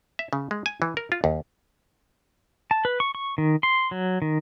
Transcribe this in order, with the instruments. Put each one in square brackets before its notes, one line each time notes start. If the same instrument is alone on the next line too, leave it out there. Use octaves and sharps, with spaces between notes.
[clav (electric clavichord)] E5
C#3
G#3
G#5
E3
A#4
F4
D#2
[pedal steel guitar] A5
B4
C#6
C#6
D#3
C6
F#3
D#3